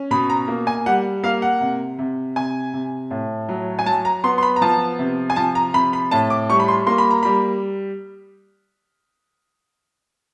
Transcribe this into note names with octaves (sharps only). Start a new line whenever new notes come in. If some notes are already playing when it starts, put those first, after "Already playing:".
Already playing: C#4
B2 B5
A#5
A#3
G#5
G3 F#5
A#3 F5
F#5
C3
C3
C3 G#5
C3
A2
F#3
G#5
F#3 A5
A#5
B3 C6
C6
B5
A#5
F3 A5
C3
G#5
F3 A5
A#5
C3 B5
B5
A2 A5
D6
G3 C#6
B5
C6
A#3 C6
B5
A#5
G3 B5